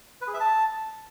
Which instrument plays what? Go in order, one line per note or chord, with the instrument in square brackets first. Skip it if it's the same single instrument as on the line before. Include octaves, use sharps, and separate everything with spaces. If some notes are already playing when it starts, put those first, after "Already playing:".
[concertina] B4
G#4
E5
A5